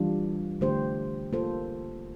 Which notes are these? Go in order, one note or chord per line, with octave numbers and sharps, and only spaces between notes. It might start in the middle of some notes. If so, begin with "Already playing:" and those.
Already playing: E3 G3 D4 F4
D3 A3 D4 G4 C5
A#3 F4 A4 C5